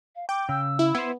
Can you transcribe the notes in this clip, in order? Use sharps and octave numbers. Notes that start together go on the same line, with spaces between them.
F5
G5 D6
C#3 E6
E4
B3 E4 C5